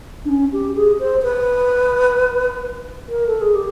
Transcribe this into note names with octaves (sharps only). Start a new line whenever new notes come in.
D4
C#4
G4
G#4
C5
B4
A#4
A4
G#4
G4